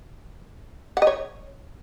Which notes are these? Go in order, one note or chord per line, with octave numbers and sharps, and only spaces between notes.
F#5
D#5
C#5